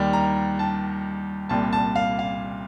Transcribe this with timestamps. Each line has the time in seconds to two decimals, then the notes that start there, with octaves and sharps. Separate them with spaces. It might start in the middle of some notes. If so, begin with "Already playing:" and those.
Already playing: D#2 D#3 G3
0.13 A#5
0.59 A5
1.49 C2 A#2 G3 A5
1.73 A5
1.96 F5
2.19 F5